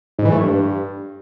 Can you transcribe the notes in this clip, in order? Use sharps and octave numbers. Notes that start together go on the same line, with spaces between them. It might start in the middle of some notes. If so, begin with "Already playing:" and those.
G#2
E3
A3
G2